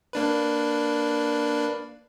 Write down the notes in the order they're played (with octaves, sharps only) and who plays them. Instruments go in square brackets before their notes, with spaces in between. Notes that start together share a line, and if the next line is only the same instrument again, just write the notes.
[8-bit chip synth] A#3 D4 B4